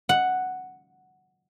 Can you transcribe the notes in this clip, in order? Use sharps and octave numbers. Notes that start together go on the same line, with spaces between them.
F#5